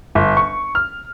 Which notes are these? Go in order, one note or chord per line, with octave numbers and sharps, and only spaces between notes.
G1
C#6
F6